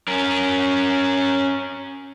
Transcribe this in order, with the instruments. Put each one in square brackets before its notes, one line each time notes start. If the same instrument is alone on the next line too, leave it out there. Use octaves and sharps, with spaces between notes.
[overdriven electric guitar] C#4 A#4